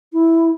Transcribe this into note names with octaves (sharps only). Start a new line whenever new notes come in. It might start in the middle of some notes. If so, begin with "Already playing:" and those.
E4